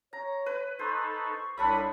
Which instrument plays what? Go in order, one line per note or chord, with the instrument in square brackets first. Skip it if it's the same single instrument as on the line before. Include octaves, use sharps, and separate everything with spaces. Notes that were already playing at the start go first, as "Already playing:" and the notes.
[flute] C#5 [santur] A#5
[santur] B4
[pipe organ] D#4 A4 B4 [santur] C5 [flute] C#6
[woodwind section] C2 B5 [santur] D4 A4 E5 [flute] C#5 [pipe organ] D#6